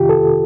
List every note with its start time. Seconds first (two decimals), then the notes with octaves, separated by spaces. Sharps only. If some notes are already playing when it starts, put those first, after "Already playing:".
Already playing: F2 C3 D#3 F4 G4
0.09 A4